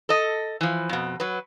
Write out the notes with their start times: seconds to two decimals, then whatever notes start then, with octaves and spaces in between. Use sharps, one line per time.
0.09 A4 D#5
0.61 E3 F3
0.89 F2 B2
1.20 F#3 B4